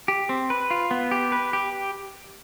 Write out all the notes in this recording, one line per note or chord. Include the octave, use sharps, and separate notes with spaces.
G4
C4
B4
F4
B3
G4
B4
G4